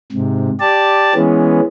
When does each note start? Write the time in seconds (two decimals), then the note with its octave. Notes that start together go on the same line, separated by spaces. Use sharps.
0.12 G#2 C3
0.60 G4 D5 A5
1.15 E3 G#3 B3 C#4